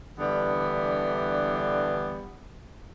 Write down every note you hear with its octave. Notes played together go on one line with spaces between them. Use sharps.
D3 E3 G3 B3 D4